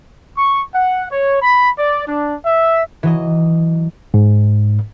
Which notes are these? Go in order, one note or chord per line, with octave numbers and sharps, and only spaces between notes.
C#6
F#5
C#5
B5
D5
D4
E5
E3 F#3 D#5
G#2